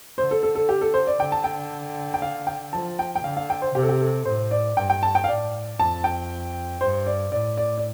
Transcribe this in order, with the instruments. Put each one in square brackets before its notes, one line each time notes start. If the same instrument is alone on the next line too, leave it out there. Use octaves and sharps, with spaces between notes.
[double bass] D3 [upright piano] C5
[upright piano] A4
A4
A4
G4
A4
C5
D5
[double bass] D3 [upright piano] G5
[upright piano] A5
G5
G5
F5
G5
[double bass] F3 [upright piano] A5
[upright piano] G5
G5
[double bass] D3 [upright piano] F5
[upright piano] F5
G5
C5
[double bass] C3 [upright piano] G4
[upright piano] A4
G4
A4
[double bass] A2 [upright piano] C5
[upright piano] D5
[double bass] G2 [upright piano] G5
[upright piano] G5
A5
G5
F5
[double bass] A2 [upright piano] D5
[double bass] F2 [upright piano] A5
[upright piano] G5
[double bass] G2 [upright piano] C5
[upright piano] D5
[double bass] A2 [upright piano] D5
[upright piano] D5
D5